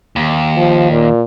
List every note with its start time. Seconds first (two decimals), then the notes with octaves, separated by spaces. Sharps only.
0.16 D#2
0.56 F3
0.91 A#2